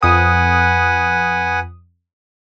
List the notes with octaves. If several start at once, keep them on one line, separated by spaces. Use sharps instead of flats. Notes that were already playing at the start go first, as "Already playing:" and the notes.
F2 B4 F#5 G#5 D#6